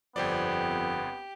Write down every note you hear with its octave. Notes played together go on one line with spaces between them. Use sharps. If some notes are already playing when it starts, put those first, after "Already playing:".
G1 F2 B3 C4 G4 D5